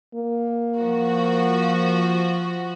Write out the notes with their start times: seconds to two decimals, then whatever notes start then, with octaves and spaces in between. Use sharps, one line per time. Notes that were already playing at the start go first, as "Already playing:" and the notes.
0.15 A#3
0.78 F3 F#4